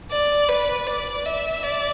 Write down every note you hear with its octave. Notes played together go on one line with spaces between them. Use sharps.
D5
B4
D5
E5
D5